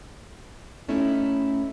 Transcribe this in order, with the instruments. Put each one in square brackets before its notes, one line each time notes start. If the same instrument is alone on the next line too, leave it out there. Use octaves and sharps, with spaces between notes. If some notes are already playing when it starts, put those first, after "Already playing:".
[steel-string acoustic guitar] A3 C#4 D#4 E4